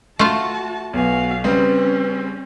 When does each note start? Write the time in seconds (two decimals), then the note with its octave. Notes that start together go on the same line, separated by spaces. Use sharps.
0.19 A3 F4 F#4 A5
0.93 B1 B3 F#4 F5 G#5
1.44 C#3 G3 C4 C#4 B4